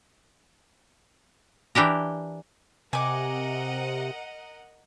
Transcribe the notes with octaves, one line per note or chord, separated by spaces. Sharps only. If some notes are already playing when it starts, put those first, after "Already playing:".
E3 D4 G4 A#4
C3 A#4 D#5 F#5 G#5 D6